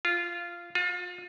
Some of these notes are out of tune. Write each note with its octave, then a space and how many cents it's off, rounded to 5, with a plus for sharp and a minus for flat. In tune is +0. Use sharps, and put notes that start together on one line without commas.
F4 -10
F4 +35